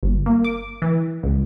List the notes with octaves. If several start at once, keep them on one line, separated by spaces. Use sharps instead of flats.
G1
A#3
D6
E3
C#2